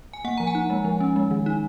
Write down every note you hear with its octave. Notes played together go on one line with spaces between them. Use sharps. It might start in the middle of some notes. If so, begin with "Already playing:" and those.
G#5
A#3 F#5
F3 A#5
G#5
D#4
G#3
F3
C#4
G#3
D#3
D#4